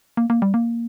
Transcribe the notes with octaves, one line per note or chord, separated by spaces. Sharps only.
A#3
A#3
G3
A#3